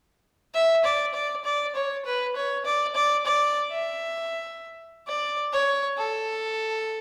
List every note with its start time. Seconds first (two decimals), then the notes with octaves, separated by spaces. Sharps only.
0.54 E5
0.85 D5
1.14 D5
1.45 D5
1.75 C#5
2.05 B4
2.36 C#5
2.65 D5
2.95 D5
3.26 D5
3.71 E5
5.07 D5
5.53 C#5
5.97 A4